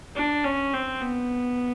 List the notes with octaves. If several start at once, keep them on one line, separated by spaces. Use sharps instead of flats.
D4
C#4
C4
B3